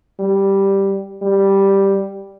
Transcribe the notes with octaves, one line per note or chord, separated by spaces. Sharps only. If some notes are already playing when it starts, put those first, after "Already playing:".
G3
G3